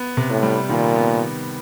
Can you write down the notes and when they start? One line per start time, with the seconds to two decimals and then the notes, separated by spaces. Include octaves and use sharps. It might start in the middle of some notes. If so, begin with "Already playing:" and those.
Already playing: B3
0.17 C3
0.30 A2
0.43 G3
0.69 A#2 D#3
0.95 B3